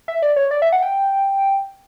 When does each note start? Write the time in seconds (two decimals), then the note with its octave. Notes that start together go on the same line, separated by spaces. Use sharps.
0.08 E5
0.22 D5
0.36 C#5
0.51 D5
0.62 E5
0.72 F#5
0.82 G5